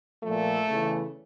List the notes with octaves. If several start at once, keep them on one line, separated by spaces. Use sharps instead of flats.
A#2 F3 A3
E2 C#3 E3